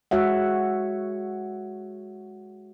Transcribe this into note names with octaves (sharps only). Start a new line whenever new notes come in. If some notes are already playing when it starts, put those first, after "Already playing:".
G#3 F#4 C#5 E5 F#5